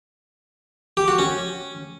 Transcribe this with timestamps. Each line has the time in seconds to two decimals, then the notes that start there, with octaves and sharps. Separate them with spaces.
0.97 G4
1.08 F#4
1.19 C#4